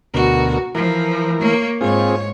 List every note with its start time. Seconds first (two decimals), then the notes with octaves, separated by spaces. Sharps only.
0.14 D2 B2 F#4 A#4
0.75 E3 F3 A#4
1.40 A#3 C#5
1.81 G#2 C4 F4 G#4 C#5